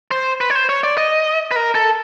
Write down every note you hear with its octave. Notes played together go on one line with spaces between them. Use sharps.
C5
B4
C#5
C5
C#5
D5
D#5
B4
A#4
A4